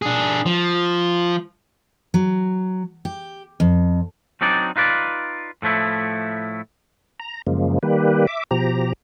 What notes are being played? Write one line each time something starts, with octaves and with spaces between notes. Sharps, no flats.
D4 G#4
F3
F#3
G4
F2
F#3 C4 D4 D#4 D5
D#4 F4 B4 D5
A2 F3 A3 E4
A#5
F#2 C#3 F3 G#3 A#3
D#3 G3 A#3 G4 B4
E5 D6
B2 F3 G4 A#5